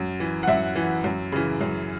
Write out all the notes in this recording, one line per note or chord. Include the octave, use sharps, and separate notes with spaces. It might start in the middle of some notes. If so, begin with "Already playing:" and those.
Already playing: F#2
E3
F#5
F#2 E5
E3
F#2
C#3 E3
F#2